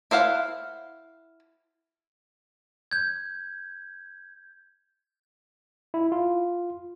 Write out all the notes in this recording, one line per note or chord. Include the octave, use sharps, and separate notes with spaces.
E4 C5 F5 F#5
G6 G#6
E4
F4